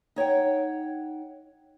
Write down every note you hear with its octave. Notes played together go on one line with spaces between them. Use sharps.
D#4 C#5 F#5 G5